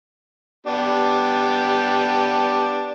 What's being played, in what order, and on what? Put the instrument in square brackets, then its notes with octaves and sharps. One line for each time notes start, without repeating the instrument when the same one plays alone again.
[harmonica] B3 D4 G4